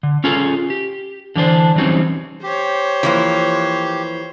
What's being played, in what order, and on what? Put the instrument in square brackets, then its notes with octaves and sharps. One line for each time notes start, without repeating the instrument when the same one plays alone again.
[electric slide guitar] D3
C#4 F4 G#4 A4
G4
D3 E3 D4 C5
E3 F#3 G3 C4 C#4 D#4
[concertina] G4 [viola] C5 C#5
[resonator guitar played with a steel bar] E3 F3 A#3